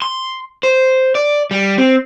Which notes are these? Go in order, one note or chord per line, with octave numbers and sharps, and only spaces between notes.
C6
C5
D5
G3
C4